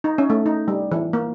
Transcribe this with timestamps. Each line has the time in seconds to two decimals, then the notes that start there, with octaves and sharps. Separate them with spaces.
0.04 D#4
0.18 C#4
0.30 A3
0.46 D#4
0.68 G3
0.92 E3
1.13 A#3